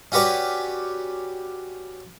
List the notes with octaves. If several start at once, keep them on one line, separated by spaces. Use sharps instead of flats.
C#4 F#4 G4 B4 D5